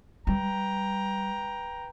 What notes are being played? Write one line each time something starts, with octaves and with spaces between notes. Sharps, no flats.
G3 B4 G5 A#5